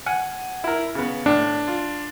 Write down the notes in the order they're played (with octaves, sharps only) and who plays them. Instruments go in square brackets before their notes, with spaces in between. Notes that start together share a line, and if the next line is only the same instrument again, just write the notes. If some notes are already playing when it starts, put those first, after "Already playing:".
[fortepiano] F#5 G#5
E4 A#4
C#3 B3
[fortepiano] A2 [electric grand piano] D4
[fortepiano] F4